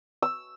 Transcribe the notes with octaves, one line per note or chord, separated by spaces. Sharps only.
E6